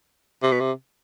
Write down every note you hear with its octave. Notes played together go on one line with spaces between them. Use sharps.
C3
B2
C3